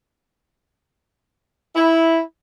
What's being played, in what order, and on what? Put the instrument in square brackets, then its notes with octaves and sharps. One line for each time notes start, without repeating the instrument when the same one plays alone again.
[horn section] E4